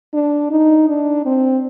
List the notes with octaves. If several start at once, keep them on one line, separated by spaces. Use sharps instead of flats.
D4
D#4
D4
C4